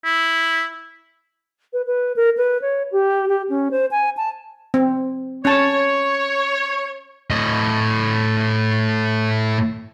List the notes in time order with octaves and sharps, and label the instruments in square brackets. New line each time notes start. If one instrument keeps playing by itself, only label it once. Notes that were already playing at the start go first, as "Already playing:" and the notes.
[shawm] E4
[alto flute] B4
B4
A#4
B4
C#5
G4
G4
C#4
C5
G#5
A5
[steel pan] C4
[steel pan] C#4 A5 [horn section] C#5
[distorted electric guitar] A2 D#5